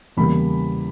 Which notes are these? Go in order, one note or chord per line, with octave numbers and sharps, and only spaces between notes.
E2 C#3 E3 G3 A#3 B5